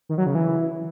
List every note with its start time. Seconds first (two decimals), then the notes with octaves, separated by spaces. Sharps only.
0.09 D#3
0.18 F#3
0.26 C#3
0.35 E3